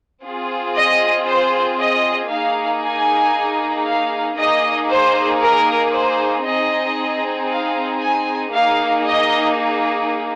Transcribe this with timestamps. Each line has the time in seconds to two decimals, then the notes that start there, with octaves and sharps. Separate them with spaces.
0.23 C4 F4 G#4
0.75 D#5
1.27 C5
1.78 D#5
2.30 A#3 D#4 G#4 F5
2.82 G#5
3.85 F5
4.38 A#3 D#4 G#4 D#5
4.90 C5
5.42 A#4
5.93 C5
6.45 C4 D#4 G#4 D#5
7.50 F5
8.01 G#5
8.53 A#3 D#4 G#4 F5
9.05 D#5